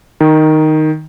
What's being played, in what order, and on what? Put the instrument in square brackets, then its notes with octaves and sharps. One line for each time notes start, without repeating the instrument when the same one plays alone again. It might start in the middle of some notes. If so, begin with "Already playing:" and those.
[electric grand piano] D#3